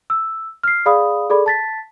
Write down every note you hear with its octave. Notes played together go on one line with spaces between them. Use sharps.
E6
F6 C7
G#4 D5 F5 B5 D#6
G#4 A4 D5 B5
A5 A6 B6